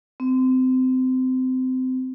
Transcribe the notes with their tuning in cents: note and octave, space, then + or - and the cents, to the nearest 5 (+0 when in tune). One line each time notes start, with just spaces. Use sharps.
C4 -25